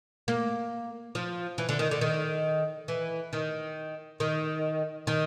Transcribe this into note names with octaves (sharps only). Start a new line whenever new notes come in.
A#3
F3
E3
D3
D#3
D3
D#3
E3
D#3
D#3
D#3